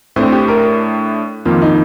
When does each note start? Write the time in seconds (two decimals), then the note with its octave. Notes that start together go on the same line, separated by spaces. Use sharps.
0.16 A2 A3 C4 D4
0.32 G4
0.48 A#4
1.45 F2 D#3 A#3 F4
1.62 D#4